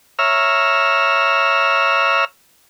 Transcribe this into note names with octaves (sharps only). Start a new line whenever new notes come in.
C#5 E5 A#5 E6 F6